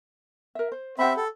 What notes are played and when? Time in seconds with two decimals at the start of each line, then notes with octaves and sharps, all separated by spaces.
0.55 A#4 E5
0.72 C5
0.99 C4 G4 E5 F#5 B5
1.17 A4